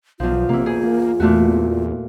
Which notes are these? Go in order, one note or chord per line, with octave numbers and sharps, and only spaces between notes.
B1 E2 F3 F4
C3 A#3 E4
B2 G#4
A#3
E2 A#2 A3 F#4